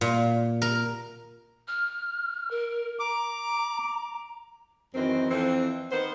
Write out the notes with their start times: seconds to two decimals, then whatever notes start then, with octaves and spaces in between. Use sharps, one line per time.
0.01 A#2
0.62 A#4
1.68 F6
2.51 A#4
2.99 A#5 D6
4.95 F#2 D#3 E3 C4
5.30 F2 E3 C4
5.92 D#3 B3 C5